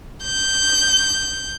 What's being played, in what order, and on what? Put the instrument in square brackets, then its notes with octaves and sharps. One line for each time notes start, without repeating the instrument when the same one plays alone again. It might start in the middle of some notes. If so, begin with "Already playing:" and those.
[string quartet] G6